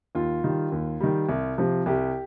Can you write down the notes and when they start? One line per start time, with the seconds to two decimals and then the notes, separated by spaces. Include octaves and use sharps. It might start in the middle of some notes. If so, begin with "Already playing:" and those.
0.15 D#2 F4
0.44 D#3 G3
0.72 D#2
1.00 D#3 G3
1.29 C2
1.58 C3 F3
1.86 C2 G4